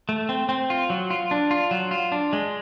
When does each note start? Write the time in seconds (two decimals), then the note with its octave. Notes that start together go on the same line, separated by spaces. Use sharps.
0.09 A3
0.29 C4
0.49 C4
0.70 F4
0.90 F#3
1.10 F4
1.31 D4
1.51 F4
1.71 F#3
1.91 F4
2.12 D4
2.33 G#3